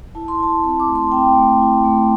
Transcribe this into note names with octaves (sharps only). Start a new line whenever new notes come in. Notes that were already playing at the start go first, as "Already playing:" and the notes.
E4 A5
C6
E4 A5
C4 C6
D6
A3
C6
C4 G5
A3
E4
A3